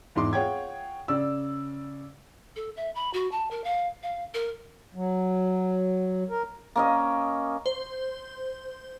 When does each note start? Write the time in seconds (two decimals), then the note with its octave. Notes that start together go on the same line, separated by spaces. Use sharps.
0.15 E2 G#2 E4 C6 D6
0.33 F4 G#4 C#5 F#5 G5 G#6
1.08 C#3 D5 E6
2.56 A4
2.77 E5
2.95 B5
3.13 F#4
3.31 A5
3.51 A#4
3.64 F5
4.03 F5
4.34 A#4
4.95 F#3
6.30 A#4
6.76 A#3 C#4 D#5
7.66 C5